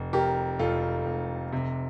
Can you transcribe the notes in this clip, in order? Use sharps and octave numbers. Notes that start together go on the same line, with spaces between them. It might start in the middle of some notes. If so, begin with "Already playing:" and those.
Already playing: F1
F1 G4 A#4
F1 F4 A4
F1
C3